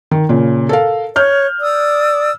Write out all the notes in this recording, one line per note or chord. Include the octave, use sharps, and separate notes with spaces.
D#3
A#2 C#3
A4 A#4 F5
C#5 F6 G6
D5 D#6 E6